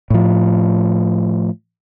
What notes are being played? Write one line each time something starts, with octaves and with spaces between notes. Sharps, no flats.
A2 F3